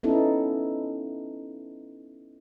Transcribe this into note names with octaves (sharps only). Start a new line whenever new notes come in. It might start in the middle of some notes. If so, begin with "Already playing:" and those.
B3 C#4 D#4 E4 A4